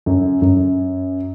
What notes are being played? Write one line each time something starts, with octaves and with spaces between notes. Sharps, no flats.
F#2
F#2